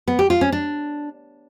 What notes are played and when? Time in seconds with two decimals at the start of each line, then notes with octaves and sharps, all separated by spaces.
0.08 B3
0.19 G4
0.30 F4
0.41 C#4
0.52 D4